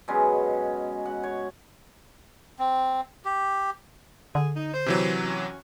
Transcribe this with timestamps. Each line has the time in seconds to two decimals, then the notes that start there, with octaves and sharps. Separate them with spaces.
0.08 B2 F#3 G#3 C#4
1.06 F#5
1.23 C#5
2.59 C4
3.25 G4
4.35 D3 G#4
4.56 D#4
4.74 C5
4.86 C3 E3 F#3
5.24 C#4 F#4